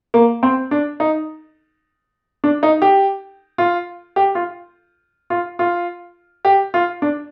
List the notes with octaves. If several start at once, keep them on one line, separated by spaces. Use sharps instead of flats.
A#3
C4
D4
D#4
D4
D#4
G4
F4
G4
F4
F4
F4
G4
F4
D4